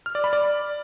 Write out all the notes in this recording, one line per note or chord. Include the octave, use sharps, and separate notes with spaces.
F6
D5
B5
D5